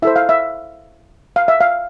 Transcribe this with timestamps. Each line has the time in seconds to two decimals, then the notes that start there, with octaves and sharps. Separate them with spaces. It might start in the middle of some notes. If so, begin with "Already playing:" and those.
0.02 E4 A4 C5 E5
0.16 F5
0.29 E5
1.36 F5
1.48 E5
1.61 F5